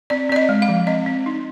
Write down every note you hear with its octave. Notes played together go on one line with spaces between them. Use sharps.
C4 D5
C4 D5
D#5
G#3
F5
F3
C4 D#5
C4
D#4